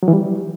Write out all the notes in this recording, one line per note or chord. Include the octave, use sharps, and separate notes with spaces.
F#3
E3
G3